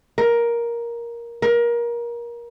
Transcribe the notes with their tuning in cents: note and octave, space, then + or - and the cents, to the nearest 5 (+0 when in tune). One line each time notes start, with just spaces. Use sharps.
A#4 +10
A#4 +25